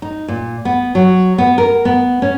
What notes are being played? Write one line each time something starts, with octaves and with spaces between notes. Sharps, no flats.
D#4
A#2
B3
F#3
B3
A#4
B3
C#4